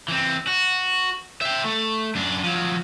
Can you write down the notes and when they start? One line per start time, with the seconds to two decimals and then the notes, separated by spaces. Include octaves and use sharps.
0.08 E3 C4
0.47 F#4
1.41 E5 G5
1.65 A3
2.15 F#2 D4
2.44 F3 F#3